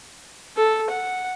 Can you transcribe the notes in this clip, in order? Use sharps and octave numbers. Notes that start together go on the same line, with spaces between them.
A4
F#5